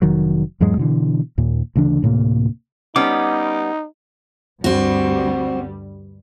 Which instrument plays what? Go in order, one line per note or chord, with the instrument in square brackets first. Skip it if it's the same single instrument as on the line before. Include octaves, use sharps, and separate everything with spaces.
[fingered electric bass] F1 D#3 F#3
E2 G#2 F#3 G#3
B2 D3 E3
D#2 A#2
D2 C#3 E3 D4
D2 A2 C3 A#3
[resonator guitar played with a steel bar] G3 B3 C#4 [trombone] D#4 [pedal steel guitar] D6
[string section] D2 G2 G3 [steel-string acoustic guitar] C4 F#4